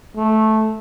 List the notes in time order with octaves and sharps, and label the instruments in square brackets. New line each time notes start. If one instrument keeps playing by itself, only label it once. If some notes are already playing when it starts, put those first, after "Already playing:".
[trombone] A3